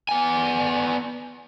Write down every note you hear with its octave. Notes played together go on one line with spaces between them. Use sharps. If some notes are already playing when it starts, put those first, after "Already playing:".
B3 G#5